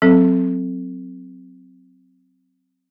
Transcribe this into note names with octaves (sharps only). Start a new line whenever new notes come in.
F#3 C4 A4